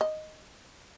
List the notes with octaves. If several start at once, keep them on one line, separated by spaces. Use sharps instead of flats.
D#5